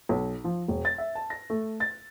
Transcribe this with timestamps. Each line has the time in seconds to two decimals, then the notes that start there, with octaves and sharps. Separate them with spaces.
0.09 B1
0.44 F3
0.68 E1
0.85 A6
0.98 E5
1.15 A5
1.30 A#6
1.50 A3
1.80 A6